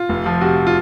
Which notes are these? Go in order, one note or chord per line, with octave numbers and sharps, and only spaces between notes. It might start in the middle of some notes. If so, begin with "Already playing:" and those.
Already playing: F4
F1
F3
C3 F#4
F4